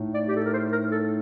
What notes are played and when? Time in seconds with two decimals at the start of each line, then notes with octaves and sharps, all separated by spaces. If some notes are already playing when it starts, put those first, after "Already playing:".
Already playing: A2 A3 D#4
0.12 D5
0.27 G4
0.36 A4
0.44 A#4
0.52 C5
0.71 A#4
0.91 A4